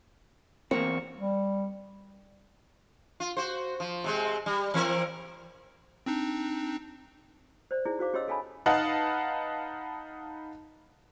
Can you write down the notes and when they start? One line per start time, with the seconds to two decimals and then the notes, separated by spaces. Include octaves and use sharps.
0.71 E2 A#3 C4 C#6
1.17 G3
3.20 F4
3.37 F#4 C5
3.80 F3
4.04 C3 G#3 C4
4.46 G3
4.74 E3 C4 A#4
6.06 C4 D4 D#4
7.71 C5 D5
7.85 D#4 E4 G#4 D5
7.99 F#4 C5 F5 D6
8.13 C#4 G4 C#5 D#5 C6 E6
8.28 A4 F5 G#5 A5 B5
8.66 D#4 B4 D#5 F5 F#5 A5